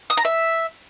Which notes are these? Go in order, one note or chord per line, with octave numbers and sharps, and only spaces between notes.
D#6
A#5
E5